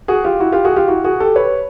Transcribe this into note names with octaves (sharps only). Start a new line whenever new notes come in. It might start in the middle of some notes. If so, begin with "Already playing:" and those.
F#4 G#4
F4 G4
E4 F#4
F4 G4
F#4 G#4
F4 G4
E4 F#4
F#4 G#4
G4 A4
B4 C#5